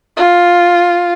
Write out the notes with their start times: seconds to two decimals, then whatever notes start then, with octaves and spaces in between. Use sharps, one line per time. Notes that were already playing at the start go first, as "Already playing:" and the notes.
0.17 F4